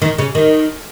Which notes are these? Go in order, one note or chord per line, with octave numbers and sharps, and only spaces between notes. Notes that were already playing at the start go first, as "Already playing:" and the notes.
D#3
C#3
D#3